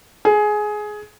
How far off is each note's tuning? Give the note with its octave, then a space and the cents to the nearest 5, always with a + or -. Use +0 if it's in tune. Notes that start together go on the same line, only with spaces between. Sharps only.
G#4 +15